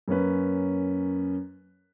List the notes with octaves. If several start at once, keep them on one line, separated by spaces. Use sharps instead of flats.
F#2 A#3 C#4 B4